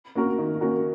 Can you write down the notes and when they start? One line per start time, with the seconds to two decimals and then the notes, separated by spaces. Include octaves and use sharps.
0.15 A#3 C#4 F#4 A#4
0.38 D#3
0.61 A#3 C#4 F#4 A#4